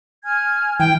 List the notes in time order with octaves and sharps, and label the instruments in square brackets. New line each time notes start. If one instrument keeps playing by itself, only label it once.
[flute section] G#5 F6 G#6
[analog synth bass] E3 [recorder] G5